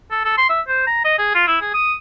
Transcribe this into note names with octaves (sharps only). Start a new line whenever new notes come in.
A4
A4
C6
E5
C5
A#5
D#5
G#4
F4
E4
G#4
D#6